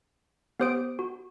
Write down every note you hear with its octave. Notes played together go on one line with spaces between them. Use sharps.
B3 G4 C5 D#6 D7
F#4